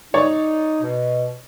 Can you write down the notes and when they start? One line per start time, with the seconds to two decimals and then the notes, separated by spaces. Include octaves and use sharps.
0.14 D#4 C#5 D5
0.82 B2